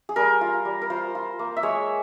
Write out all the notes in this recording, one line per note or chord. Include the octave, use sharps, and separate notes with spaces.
G#4
G3 A#4
F4
G3
A#4
F4 C5
F4
A#3
E5
G#3 C#5